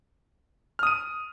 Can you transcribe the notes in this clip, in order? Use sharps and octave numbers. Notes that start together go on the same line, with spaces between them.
D#6 F6 D#7